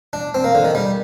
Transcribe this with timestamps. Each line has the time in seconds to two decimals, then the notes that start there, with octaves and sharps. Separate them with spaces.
0.13 D4
0.34 C4
0.44 A#3
0.55 D3
0.65 D#3
0.75 G3